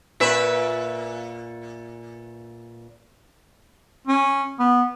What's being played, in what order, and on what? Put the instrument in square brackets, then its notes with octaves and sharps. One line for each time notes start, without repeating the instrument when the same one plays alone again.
[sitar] A#2 B4 E5
[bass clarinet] C#4
B3